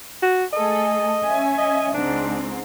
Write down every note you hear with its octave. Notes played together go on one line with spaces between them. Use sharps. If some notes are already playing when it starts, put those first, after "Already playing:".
F#4
A3 G#4 A4 D#5
C#4 E5 G#5
D#5
C#2 G#2 C4 D4